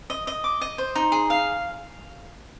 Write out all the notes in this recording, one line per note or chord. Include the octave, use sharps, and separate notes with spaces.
D#5
D#5
D6
D#5
C5
D#4
G#4
F5